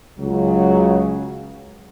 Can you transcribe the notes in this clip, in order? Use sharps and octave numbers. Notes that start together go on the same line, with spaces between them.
C#2 C#3 F#3